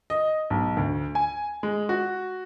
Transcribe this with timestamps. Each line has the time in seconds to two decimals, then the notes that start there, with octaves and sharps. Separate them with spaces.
0.10 D#5
0.50 B1
0.77 D2
1.15 G#5
1.63 G#3
1.89 F#4